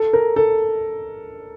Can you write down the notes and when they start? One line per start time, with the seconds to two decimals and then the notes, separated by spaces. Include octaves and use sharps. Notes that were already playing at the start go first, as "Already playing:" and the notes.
Already playing: A4
0.13 A#4
0.36 A4